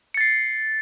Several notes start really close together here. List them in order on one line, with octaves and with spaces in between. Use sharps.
C#7 A6 C7